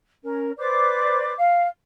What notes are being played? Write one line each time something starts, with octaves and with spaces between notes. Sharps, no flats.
C#4 A#4
B4 C5 D5 D6
F5